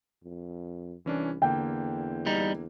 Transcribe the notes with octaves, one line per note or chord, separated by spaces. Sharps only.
F2
C2 E3 C#4 D4
E2 D3 A#3 G5
G3 D#4